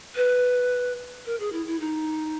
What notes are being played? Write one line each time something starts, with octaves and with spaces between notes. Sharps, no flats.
B4
A#4
G#4
E4
E4
D#4